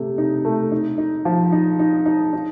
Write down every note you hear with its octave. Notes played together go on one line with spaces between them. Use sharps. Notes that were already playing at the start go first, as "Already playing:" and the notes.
Already playing: C3 A3
D#4
A3
D#4
D#4
F3
D#4
D#4
D#4
D#4